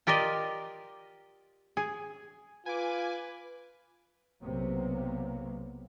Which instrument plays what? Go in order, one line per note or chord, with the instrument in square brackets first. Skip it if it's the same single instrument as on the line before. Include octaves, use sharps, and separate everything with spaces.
[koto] F4 G4 A#4 D5 D#5
G#4
[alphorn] F4 [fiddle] B4 [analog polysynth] G#5 D6
[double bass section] B1 C3 F#3 A#3 B3